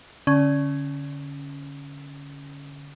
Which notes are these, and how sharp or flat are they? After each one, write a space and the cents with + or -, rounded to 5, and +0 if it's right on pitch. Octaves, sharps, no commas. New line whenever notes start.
D3 -20 C#4 +0